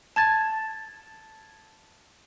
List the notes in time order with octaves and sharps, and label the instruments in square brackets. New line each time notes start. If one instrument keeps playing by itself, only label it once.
[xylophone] A5 G#6 A6